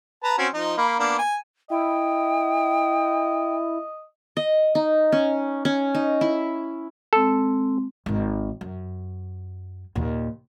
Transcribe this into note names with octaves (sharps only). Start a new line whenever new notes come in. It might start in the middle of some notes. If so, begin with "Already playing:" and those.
B4 A5 A#5
C4 C#4 F#4
F3 D#4
A#3 B5
A#3 B3 D4
G#5
E4 D#5 G5
D#5
D#4
C#4
C#4
D#4
E4
G#3 C4 A4
G#1 D#3
F#2
D#2 A#2